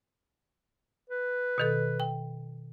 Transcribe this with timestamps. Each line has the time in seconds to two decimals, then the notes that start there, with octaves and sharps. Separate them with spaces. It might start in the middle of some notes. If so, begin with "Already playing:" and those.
1.10 B4
1.58 B2 D#3 A4
2.00 G5